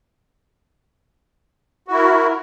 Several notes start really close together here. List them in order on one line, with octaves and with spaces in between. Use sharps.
F#4 E4 A#4